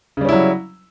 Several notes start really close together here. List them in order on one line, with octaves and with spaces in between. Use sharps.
C#3 G3 C#4 E4 F#3